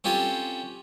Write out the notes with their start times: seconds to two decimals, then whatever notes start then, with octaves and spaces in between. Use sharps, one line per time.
0.04 C4 C#4 F4 G4 A4 C#5